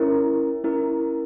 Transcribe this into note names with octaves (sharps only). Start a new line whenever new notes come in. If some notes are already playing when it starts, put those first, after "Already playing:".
Already playing: C#4 E4 A#4
C#4 E4 A#4